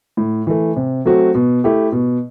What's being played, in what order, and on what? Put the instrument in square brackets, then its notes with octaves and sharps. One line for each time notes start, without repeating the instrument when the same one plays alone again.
[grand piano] A2
E3 A3
C3
F#3 A3 C4 F#4
B2
A3 E4 G4
B2